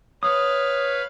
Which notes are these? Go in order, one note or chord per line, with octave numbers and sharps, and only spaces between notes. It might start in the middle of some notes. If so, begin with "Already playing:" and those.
B4 C#5 F5 D#6